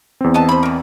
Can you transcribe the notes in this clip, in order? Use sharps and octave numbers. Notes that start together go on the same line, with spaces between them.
E2 C4
B3 D#5 A5
C5 B5
E3 A#4